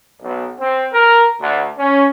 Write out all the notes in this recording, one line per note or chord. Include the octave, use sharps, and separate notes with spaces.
B1
C4
A#4
D2
C#4